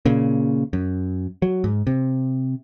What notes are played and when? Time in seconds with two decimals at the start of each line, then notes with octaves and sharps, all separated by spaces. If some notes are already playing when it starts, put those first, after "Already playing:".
0.05 A#2 C#3
0.73 F#2
1.42 F#3
1.64 G#2
1.87 C3